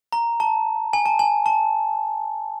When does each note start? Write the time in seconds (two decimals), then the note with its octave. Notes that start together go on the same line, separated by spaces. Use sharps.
0.12 A#5
0.40 A5
0.93 G#5
1.06 A5
1.19 G#5
1.46 A5